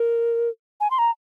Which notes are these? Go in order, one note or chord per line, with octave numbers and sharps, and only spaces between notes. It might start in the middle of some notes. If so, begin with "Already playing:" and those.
Already playing: A#4
G#5
C6
A#5